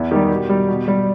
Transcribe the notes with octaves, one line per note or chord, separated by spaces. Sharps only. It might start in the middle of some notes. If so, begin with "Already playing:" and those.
Already playing: E2 E4
D#3 G3 G4
B2
G3
B2
G3